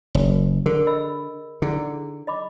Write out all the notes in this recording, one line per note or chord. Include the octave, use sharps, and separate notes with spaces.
F#1
D3 G#4 A#4
D#5 B5 E6
D3 D#4 E4 G#4
D#5 B5 D6